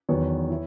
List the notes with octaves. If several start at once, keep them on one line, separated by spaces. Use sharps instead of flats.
E2 D#3 F#3 B3 C#5
E4